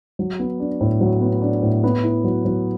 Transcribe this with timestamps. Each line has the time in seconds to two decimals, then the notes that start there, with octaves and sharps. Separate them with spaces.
0.19 F#3
0.40 B3
0.60 D4
0.81 A2
1.01 F#3
1.21 B3
1.42 D4
1.63 A2
1.84 B3
2.04 E4
2.24 F#3
2.45 F#3